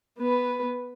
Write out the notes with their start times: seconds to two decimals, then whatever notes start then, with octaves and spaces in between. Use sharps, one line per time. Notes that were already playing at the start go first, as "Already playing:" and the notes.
0.18 B3 B4